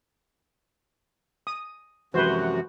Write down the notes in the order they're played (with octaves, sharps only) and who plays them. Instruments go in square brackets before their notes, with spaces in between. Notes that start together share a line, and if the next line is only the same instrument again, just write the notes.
[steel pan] D#6
[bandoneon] F#2 C3 [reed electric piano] E3 F3 G#3 [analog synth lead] F#4 [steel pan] B4 C5